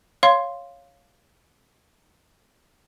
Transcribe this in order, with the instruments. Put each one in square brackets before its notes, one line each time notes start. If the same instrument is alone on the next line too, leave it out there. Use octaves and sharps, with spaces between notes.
[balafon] C#5 F5 C6